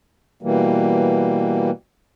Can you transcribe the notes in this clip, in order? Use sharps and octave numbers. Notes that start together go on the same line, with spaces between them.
B2 E3 G3 A#3